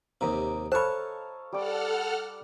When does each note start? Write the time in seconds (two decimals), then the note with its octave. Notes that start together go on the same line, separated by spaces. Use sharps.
0.21 D#2 C3 D#5 A#5
0.72 A4 C5 C#5 F5 A5 B5 C#6
1.52 G3 A4 F#5 D6 F6